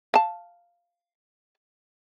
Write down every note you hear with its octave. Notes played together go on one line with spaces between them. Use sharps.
F5 A5